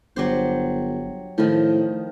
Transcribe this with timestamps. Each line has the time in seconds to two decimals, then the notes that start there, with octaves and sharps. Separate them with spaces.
0.16 G1 F#3 G4 C5
1.38 A2 D#3 F3